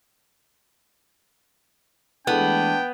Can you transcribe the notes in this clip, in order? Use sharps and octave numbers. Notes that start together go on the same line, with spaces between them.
E3 G#3 A3 B3 D4 G5